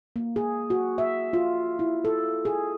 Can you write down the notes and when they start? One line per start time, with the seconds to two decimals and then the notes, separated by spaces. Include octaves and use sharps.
0.16 A#3
0.36 G#4
0.70 F#4
0.98 E5
1.33 F4
1.79 E4
2.05 A4
2.45 G#4